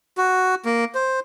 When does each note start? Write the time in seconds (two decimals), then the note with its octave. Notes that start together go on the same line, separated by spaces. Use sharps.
0.18 F#4
0.65 A#3
0.95 C5